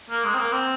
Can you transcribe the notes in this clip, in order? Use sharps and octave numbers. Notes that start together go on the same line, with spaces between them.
A#3
G#3
C4
A#3
C4